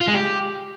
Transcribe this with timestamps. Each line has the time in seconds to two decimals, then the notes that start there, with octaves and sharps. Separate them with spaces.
0.01 F4
0.08 G#3
0.14 G4